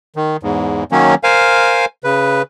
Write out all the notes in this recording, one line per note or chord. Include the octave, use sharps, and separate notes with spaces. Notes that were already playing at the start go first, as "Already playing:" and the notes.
D#3
E2 G#2
D#3 F#3 A#3 C#4
A#4 C5 F5 G#5
C#3 B4